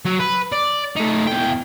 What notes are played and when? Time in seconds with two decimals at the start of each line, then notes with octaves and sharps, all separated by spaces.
0.05 F#3
0.20 B4
0.53 D5
0.96 A3 D#4
1.27 E2 G5